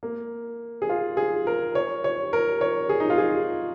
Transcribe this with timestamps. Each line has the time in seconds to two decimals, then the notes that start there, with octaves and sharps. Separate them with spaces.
0.03 A#3
0.82 G#4
0.89 F4
1.17 G#4
1.47 A#4
1.75 C#5
2.04 C#5
2.33 A#4
2.61 C#5
2.89 G#4
3.00 D#4
3.10 F4
3.18 G#4